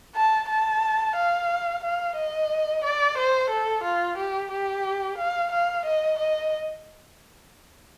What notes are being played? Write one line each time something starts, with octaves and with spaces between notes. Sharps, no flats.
A5
A5
F5
F5
D#5
D5
C5
A4
F4
G4
G4
F5
F5
D#5
D#5